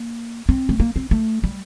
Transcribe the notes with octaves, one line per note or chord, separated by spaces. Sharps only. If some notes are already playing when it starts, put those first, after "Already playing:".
Already playing: A#3
C4
A3
A#3
C4
A3
G3